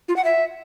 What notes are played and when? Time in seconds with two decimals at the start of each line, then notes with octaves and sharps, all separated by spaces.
0.08 F4
0.16 F#5
0.24 E5